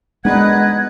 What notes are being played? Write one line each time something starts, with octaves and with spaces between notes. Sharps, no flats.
G#3 B3 D4 D#4 B4 D#5 F#5 G#6